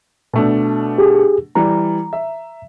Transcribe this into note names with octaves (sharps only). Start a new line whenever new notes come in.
B2 A3 D4
G4 G#4
E3 G3 A#5
E5